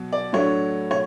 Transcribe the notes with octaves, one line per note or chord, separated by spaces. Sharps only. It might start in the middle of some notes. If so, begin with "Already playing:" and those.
Already playing: B2 F#3
D5
A2 F#3 A3 D4 C#5
C#5